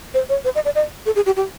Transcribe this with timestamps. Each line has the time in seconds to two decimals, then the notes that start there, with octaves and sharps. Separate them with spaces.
0.14 C5
0.29 C#5
0.45 C5
0.55 D#5
0.65 D5
0.75 D#5
1.06 A4
1.16 G#4
1.26 G4
1.36 G4